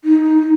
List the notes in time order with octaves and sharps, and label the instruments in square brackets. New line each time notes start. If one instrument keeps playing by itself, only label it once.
[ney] D#4